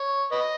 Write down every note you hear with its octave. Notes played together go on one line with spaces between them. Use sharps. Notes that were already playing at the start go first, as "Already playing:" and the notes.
Already playing: C#5
B4 D#5